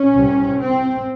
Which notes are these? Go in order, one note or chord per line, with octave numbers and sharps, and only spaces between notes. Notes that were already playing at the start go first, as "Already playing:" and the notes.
Already playing: C#4
C2 C3
C4